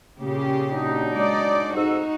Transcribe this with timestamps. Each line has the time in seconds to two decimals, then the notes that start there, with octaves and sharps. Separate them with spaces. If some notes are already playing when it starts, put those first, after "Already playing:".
0.21 A#2 C#3 G4
0.71 F#3 D4 D#4
1.12 G#3 D5
1.75 F2 G#2 D#4 F#4 E6